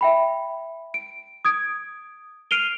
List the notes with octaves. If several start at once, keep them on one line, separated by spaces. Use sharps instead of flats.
E5 G5 B5
D7
D#6 G#6 D7
F6 C7 D7 D#7 F7 G7